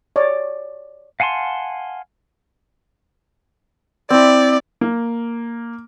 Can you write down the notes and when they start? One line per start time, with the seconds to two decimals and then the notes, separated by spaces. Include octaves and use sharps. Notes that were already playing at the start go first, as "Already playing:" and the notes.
0.16 C#5 D5
1.20 F5 F#5 G#5 A5 C6
4.10 C4 E4 D5
4.81 A#3